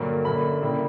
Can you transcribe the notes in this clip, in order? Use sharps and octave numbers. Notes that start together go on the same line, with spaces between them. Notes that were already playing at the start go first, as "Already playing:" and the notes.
Already playing: G2 D3 F#3 A#3
F#2 D3 A#3 B5
C#3 G3 A#3 E4